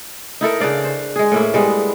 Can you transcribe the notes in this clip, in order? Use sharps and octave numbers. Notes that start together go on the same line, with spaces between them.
D#4 E4 A4 A#4
C#3 D4 D5 F5
C5
G#3 G#4
A2 A#3 E4
G3 G#3 B3